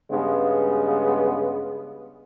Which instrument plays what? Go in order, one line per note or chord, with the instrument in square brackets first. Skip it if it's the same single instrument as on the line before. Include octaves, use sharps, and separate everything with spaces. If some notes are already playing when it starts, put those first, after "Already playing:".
[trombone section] G2 C#3 G#3 B3